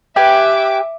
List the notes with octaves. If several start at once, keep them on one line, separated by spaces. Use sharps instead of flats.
G4 B4 E5 G#5 D6